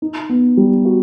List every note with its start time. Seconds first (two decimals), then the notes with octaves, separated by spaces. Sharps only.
0.02 D#4
0.29 B3
0.57 G3
0.85 F#4